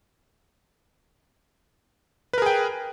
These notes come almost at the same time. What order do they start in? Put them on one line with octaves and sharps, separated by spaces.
B4 A#4 G#4 G5